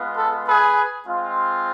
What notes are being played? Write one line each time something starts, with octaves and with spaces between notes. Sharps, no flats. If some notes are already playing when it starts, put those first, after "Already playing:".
Already playing: G#3 B3 F4
A4
G#4 B4
G#3 C4 F4